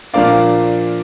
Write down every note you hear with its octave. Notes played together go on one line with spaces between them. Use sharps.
A#2 F3 A#3 D4 D5 F5